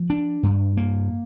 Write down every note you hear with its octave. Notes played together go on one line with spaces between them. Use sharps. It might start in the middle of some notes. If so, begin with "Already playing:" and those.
Already playing: F3
D4
G2
A#3